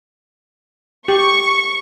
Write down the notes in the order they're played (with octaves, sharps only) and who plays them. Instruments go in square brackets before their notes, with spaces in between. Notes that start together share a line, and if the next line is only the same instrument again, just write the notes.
[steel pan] G4 [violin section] C#6